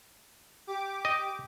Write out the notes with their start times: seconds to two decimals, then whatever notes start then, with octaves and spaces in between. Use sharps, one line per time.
0.67 G4 D6
1.05 D#5